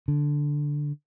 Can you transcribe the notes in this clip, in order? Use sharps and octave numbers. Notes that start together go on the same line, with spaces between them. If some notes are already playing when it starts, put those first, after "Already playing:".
D3